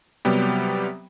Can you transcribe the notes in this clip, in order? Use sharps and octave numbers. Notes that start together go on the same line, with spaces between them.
C3 F#3 G3 B3 G4